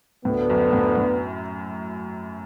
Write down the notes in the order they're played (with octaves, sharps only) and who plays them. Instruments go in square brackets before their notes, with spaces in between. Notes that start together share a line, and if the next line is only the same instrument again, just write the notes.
[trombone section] D2 D3 B3 [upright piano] A2
[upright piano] F#2
A2
A2